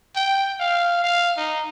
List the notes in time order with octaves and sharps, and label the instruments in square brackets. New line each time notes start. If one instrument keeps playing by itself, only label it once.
[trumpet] G5
F5
F5
D#4